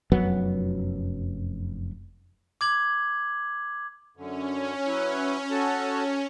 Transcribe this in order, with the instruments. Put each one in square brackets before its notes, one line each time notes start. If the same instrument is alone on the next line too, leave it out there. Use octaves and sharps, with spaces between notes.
[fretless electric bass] F1 F#2 F#3 B3
[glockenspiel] D6 G#6 F#7
[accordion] F#2 D3 [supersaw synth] C#4
[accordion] F#3 E4 B4
F#4 A4 A5